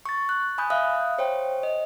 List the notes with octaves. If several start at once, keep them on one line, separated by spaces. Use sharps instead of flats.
C#6 A6
F#6
G#5 B5 D#6 G6
E5 F5 D#6 F#6
C5 C#5 G5
D#5